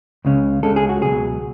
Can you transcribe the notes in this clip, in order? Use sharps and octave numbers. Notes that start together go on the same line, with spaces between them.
C#2 C#3 G#3 C#4
C#2 C#3 G#3 C#4 A4
G#4
F#4
C#2 B2 F#3 G#4